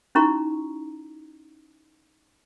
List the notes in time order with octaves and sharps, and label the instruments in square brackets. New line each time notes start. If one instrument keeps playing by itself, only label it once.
[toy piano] C#4 D#4 E4 F#4 A#5 C#6